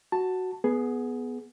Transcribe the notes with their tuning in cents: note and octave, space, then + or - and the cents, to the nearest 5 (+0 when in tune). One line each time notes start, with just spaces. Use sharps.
F#4 +0 A5 +10
B3 +0 G#4 +15